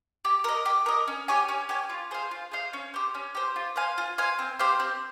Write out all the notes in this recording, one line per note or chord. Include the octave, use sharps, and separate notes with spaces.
G4
A#4 D#5
G4
A#4 D#5
C#4
G4 C#5 G#5
C#4
G4 C#5 G#5
F4
G#4 C5 F5
F4
G#4 C5 F5
C#4
G4 C5
C#4
G4 C5
F4
C5 F5 G#5
F4
C5 F5 G#5
C4
G4 C5 F5
C4